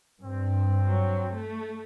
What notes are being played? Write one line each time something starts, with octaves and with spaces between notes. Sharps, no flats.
G2 C4
F#3
A3